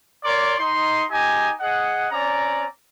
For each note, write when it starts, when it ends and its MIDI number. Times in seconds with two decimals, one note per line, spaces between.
0.24 0.54 70
0.24 0.54 73
0.24 0.54 74
0.24 0.54 84
0.24 0.54 86
0.59 1.03 63
0.59 1.03 84
1.11 1.52 63
1.11 1.52 67
1.11 1.52 75
1.11 1.52 80
1.60 2.06 68
1.60 2.06 75
1.60 2.06 78
2.11 2.65 60
2.11 2.65 61
2.11 2.65 74
2.11 2.65 82